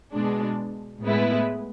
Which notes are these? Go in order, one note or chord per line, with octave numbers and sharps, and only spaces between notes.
B2 G#3 D4
A2 G#3 B3 E4 B4